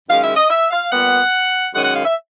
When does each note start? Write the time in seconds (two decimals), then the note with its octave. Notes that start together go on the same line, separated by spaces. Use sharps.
0.07 F#2 D#3 G#3 C#4 F5
0.22 E5
0.36 D#5
0.50 E5
0.71 F5
0.91 A#2 G3 B3 F#5
1.73 F#2 D#3 G#3 C#4 F#5
1.84 F#5
1.94 F5
2.04 E5